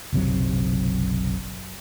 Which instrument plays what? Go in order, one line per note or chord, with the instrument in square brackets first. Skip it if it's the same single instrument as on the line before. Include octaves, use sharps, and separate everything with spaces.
[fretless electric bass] F#1 B1 C3 F#3